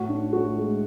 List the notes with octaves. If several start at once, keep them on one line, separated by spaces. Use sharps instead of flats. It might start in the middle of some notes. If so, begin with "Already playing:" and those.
Already playing: A2 F#4
D4
A2 F#4
G#3